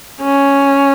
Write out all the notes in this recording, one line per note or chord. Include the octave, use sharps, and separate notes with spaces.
C#4